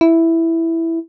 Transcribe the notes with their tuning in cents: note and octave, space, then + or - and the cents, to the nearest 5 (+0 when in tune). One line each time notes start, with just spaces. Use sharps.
E4 +0